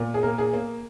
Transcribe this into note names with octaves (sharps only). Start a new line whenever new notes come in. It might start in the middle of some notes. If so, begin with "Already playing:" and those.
Already playing: A#2
G#4
A#3 A#4
G#4
A#3